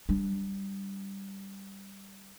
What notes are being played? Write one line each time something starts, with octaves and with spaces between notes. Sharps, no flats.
G3 D4